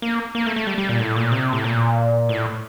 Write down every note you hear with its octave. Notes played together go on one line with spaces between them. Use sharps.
A#3
A#3
A3
A3
G3
G3
A#2
A2
A#2
C3
A2
A#2
A2